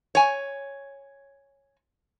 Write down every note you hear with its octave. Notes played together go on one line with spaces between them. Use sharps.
C#5 G#5